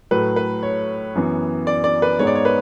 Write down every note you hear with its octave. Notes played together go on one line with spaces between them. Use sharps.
A2 F#3 A3 B4
B4
C#5
F#2 E3 B3
D5
D5
B4
G#2 G#3 B3 C#5
D5
C#5
B4